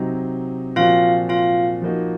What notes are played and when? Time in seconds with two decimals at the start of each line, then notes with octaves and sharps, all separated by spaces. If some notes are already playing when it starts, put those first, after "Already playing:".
Already playing: C3 F#3 C4 D#4
0.76 A#2 F3 C4 F4 F#4 F5
1.29 F4 F5
1.82 F3 A#3 D#4 F#4